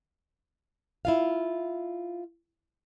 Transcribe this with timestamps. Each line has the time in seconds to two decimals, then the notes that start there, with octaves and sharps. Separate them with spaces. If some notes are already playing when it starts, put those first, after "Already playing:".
1.05 E4 F4 F5